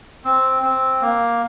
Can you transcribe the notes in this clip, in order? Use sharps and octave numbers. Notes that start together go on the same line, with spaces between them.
C4
C4
A#3